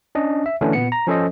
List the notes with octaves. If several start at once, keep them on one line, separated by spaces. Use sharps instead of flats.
C#4 D4 D#5
E5
D3 E3 A3 C#4 D4
A#2 B3 C#7
A#5
F3 C#4 A4 C5 D#5